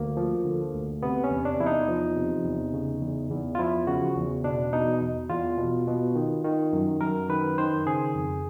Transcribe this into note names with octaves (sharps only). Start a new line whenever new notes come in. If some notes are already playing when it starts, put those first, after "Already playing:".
Already playing: D2 A#3
F3
D3
D2
C3 B3
C#4
E2
D4
E2 E4
D#4
F3
C3
E2
C#3
E2
E2
F4
F3 E4
C#3 F#4
E2
B2 D4
B2 D#4
E2
E2 F4
B2
B2
D#3
D#3
F#2
F#2 A#4
D#3 B4
D#3 C5
C#3 G#4
F2